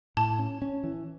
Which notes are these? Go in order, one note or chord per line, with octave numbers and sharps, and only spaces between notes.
A2 A5
C#4
C#4
E3